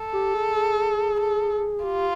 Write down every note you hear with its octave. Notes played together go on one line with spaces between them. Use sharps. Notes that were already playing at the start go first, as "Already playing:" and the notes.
Already playing: A4
G4
G#4
G#4
A4
F4 G4